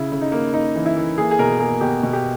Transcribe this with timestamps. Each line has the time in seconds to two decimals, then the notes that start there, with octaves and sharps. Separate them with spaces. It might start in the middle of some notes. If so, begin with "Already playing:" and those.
Already playing: C#3 E4
0.12 C#3
0.21 D#4
0.32 A#3
0.53 A#3 D#4
0.75 E3
0.86 E4
0.96 E3
1.18 A#3 G#4
1.31 G#4
1.39 B2 A#4
1.60 A#3 G#4
1.81 B2 G4
2.03 B2
2.13 G4